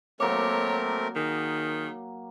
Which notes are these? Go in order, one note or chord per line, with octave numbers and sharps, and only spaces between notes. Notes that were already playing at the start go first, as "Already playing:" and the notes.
F#3 A3 A#3 C4 A#4 C#5 D6
D#3 G#4